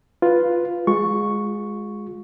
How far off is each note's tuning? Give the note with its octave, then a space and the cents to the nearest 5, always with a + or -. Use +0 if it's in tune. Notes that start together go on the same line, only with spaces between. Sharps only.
F4 +0 B4 +0
G#3 +0 F4 +35 C#6 +0